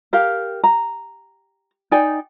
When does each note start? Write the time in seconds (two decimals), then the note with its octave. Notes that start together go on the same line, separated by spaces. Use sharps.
0.13 G4 A#4 F5
0.64 A#5
1.91 D#4 D5 G5 G#5